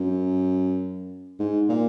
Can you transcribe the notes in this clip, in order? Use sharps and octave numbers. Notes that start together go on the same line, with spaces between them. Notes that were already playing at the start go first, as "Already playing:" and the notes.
Already playing: F#2
G#2
A#2